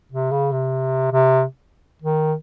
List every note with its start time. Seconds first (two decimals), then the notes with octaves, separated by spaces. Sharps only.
0.12 C3
0.31 C#3
0.52 C3
1.12 C3
2.02 D#3